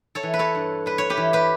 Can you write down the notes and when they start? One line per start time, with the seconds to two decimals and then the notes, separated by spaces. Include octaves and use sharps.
0.15 A4 C#5
0.23 E3
0.34 B4
0.39 A4 C#5
0.55 G2
0.86 G3 B4
0.98 C#5
1.10 G4 B4
1.17 E3
1.33 G4 B4